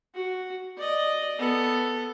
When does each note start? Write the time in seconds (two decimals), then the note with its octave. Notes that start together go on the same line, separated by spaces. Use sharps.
0.14 F#4
0.77 D5 D#5
1.39 B3 A4